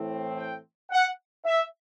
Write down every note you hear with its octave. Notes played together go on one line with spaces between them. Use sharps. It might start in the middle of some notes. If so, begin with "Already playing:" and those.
Already playing: A2 E3 A3 C4
G5
F#5
E5